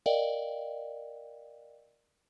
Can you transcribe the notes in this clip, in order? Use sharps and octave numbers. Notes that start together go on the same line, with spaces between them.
A#4 D5 D#5 F5 G5